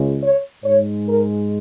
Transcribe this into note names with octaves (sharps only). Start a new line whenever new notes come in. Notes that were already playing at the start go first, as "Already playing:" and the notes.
Already playing: C#2 C#3 G#3
C#5
G#2 G#3 C#5
A#4